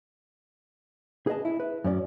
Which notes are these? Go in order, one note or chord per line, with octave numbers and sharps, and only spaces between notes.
G#4 B4 D#5 A5
E4
B4
F#2 C#4 D5